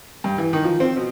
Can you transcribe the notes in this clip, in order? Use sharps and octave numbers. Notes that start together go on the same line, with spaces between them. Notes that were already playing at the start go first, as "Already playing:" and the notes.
G2
E3
D#3
F3
C4
B2